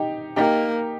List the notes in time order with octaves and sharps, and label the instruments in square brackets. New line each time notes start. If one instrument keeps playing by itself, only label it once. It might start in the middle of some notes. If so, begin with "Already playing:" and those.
Already playing: [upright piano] D#4 G4
[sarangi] A#3 [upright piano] D#4 G4